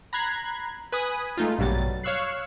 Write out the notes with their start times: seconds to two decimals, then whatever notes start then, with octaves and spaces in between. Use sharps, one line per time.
0.13 A#5 B5 F#6 G#6 C7
0.92 B4 G#5 B5 D#6
1.37 G#3 A3 D#4 F4
1.59 A#1 G2 B2 F#3 G3 A6
2.03 C#5 F5 C#6 E6 F#6 C7